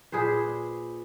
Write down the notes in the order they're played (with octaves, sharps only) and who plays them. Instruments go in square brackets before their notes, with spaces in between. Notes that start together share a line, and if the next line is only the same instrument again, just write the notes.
[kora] A#2 G#4 B4 C5